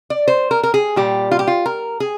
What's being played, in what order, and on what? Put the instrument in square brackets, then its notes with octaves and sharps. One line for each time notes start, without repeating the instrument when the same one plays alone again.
[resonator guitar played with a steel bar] D5
C5
A#4
A#4
G#4
A#2 G3 G4
F4
G4
F4
A#4
G#4